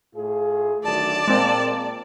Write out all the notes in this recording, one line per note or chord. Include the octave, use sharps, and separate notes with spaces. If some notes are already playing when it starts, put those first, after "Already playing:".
A2 F4 G#4
D2 D#3 F#3 D5 A5
A#2 G#3 A#3 C4